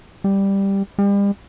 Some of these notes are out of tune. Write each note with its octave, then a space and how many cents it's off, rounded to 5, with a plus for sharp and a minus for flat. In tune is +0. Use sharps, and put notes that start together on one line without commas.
G3 +5
G3 +40